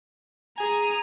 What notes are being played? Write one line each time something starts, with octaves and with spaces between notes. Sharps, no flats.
G#4 G#5 A#5 D#6